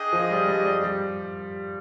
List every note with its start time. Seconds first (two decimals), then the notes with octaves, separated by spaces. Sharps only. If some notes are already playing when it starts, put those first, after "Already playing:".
Already playing: D4 G#4 D#5 G5
0.13 F3
0.31 G3
0.48 G3
0.66 G3
0.84 G3